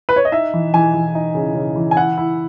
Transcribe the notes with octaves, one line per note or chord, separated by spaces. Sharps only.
B4
C#5
D#5
D#4 E5
E3
E3 G#5
E3
D#4
C#3
C#3
E3
G#5
E4 F#5
E4